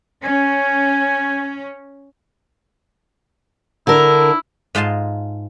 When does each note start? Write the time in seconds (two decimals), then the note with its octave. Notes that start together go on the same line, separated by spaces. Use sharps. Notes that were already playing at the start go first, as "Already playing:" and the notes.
0.25 C#4 G#5
3.87 D3 E4 A#4
4.75 G#2 F4 D#5 A5 C6